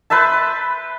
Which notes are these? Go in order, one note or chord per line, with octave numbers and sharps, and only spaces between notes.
B4 C5 E5 A5